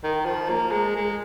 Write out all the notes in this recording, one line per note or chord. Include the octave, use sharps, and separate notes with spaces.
D#3
F3
A#3
G#3
G#3